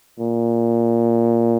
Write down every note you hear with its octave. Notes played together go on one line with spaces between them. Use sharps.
A#2